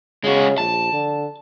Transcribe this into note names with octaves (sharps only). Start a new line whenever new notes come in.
C#3 G#3 F#4
A#1 A5
D3